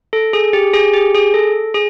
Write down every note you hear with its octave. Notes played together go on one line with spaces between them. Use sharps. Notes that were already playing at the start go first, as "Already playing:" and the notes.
A4
G#4
G4
G#4
G4
G#4
A4
G#4